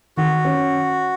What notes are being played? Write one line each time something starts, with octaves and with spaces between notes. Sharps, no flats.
D#3 F#4
C#4